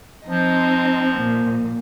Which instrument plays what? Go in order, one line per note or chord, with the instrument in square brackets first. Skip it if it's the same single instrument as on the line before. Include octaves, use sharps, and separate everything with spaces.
[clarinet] F3 [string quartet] C4 D#4 D#5
[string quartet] A#2